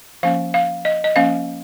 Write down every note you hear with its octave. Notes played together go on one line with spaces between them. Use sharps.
F3 A#3 C#4 F5
F5
D#5
D#5
F3 A#3 C#4 F5